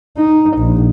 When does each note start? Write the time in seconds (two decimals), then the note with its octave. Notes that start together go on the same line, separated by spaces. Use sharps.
0.18 D#4
0.57 A#1